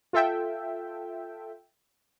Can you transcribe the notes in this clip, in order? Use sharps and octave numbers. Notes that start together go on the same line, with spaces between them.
F4 A4 E5 G5